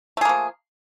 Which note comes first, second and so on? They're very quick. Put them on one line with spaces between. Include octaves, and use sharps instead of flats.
A3 G#4 A#3 F3